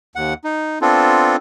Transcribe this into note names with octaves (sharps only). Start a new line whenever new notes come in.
D#2 F#5
D#4
B3 C4 D4 F4 A4